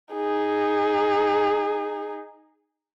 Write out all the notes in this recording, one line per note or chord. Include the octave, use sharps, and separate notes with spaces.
D#4 G#4